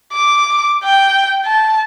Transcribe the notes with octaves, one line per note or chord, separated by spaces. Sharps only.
D6
G5
A5